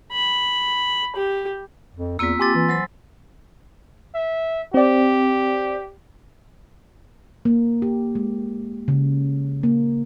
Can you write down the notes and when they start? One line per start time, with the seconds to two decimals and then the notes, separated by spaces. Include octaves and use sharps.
0.12 B5
1.15 G4
1.95 F2
2.19 E2 A#3 C4 F4 E6 B6
2.40 G4 G#5 C6 A6
2.55 E3
2.69 F#3 C5 B5
4.15 E5
4.74 C4 G4 D5
7.45 A#3
7.82 G4
8.15 G#3
8.88 C#3
9.63 A#3